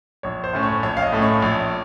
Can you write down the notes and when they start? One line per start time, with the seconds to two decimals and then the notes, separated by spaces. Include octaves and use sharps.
0.23 A#1 C#5
0.44 C5
0.53 A2 A3 C#4
0.63 C#5
0.83 A#1 C#5
0.97 F5
1.02 D#5
1.12 A2 A3 C#4
1.22 C#5
1.42 A#1